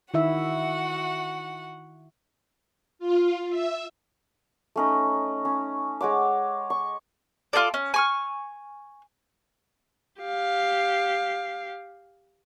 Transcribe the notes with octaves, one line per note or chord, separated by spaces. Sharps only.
D#3 E4 F#4 E5 F#5
F4
E5
A3 C#4 D#4
C#4
G#3 C#5 F#5 D6
C#6
F4 G#4 A4 D5
C#4
G#5 C#6 F6
G4 F5